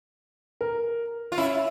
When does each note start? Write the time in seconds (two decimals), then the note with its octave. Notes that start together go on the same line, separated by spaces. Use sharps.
0.61 A#4
1.32 F4
1.37 C#4 E4